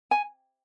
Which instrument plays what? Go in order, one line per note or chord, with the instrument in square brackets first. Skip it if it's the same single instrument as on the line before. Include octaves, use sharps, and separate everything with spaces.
[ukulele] G#5